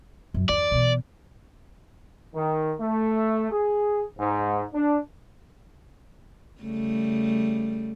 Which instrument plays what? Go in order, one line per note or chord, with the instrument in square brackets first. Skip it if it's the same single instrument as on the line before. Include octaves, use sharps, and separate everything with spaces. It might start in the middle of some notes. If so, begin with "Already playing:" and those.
[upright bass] F#2
[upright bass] E2 [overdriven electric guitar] D5
[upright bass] B2 E3
[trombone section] D#3
A3
G#4
G#2
D4
[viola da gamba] C#3 G3 A3